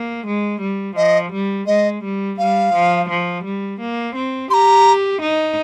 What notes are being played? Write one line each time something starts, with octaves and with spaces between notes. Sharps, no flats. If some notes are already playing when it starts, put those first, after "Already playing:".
Already playing: A#3
G#3
G3
F3 D#5
G3
G#3 D#5
G3
G3 F5
F3
F3
G3
A#3
C4
G4 A#5 C6
D#4